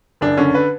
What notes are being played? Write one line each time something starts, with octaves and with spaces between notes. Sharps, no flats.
F#1 D4
D3 C#4
B4